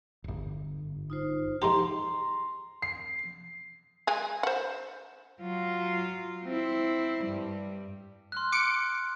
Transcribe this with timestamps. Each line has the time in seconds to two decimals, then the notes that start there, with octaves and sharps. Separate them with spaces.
0.24 D1 G1
1.10 D#4 F4 C5
1.62 G#2 G4 A#5 C6
2.82 C7
4.07 G#3 G#4
4.43 C5 F#5
5.41 F#3 F4
6.45 C4 E4
7.23 G2 G3
8.32 C6 F6 F#6
8.52 D6 C#7 D7